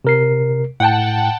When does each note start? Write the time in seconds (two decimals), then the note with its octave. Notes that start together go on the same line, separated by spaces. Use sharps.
0.05 C3 A#4 C7
0.80 A2 F#5 G5 A5